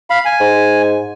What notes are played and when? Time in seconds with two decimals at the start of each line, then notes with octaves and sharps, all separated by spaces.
0.10 F5 B5
0.25 G#5
0.40 G#2